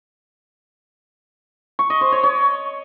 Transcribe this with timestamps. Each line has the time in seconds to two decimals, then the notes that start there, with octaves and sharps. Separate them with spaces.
1.79 C#6
1.90 D#5
2.01 C5
2.12 C#5
2.23 C#5